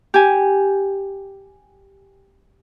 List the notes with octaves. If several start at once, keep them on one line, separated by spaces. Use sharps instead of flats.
G4 G#5